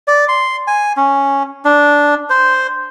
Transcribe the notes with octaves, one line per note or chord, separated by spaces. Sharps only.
D5
C6
G#5
C#4
D4
C5